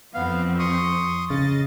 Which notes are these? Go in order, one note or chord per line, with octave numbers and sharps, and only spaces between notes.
F2 B3 C4 F5
C6 C#6 D#6
A1 C#3 D#5 A6